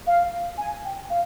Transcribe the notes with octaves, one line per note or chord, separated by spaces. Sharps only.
F5
G#5
G5
F5